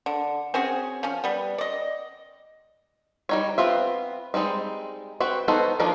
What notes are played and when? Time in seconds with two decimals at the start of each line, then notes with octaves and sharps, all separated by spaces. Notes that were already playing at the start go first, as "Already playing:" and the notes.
0.06 D3
0.54 C4 C#4 F#4 G#4
1.03 F3 C#4
1.24 G3 B3
1.58 D5 D#5
3.29 G3 D#4 C#5
3.58 B3 C4 F4 E5
4.34 G3 G#3 C4 D#4
5.20 C4 F#4 B4
5.48 B3 D#4 F#4 A4 C5
5.80 D#3 F3 A#3 D4 D#4